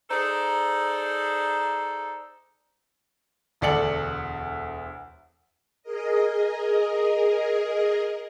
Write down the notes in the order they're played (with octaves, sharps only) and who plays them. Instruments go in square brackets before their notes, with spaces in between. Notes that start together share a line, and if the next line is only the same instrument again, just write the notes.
[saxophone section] D#4 G#4 A4 C5 D5
[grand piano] E1 D2 A4 D5 C#7 F#7
[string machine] G#4 A#4 D#5